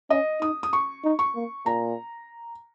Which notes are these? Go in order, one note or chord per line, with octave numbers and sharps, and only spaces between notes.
C#4 D#5
D#4 D#6
D#6
C#6
D#4
C#6
A#3
A#2 A#5